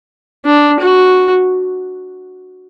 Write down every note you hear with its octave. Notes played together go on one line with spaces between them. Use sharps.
D4
F#4